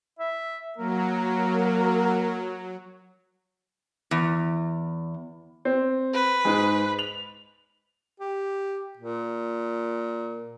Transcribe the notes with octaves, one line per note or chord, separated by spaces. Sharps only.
E5
F#3 A#3 A#4
E2
C4
B4
G#2 G#3
F7 F#7
G4
A#2